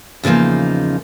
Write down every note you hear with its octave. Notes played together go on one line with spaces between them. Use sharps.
E2 C#3 F3 A#3 D#4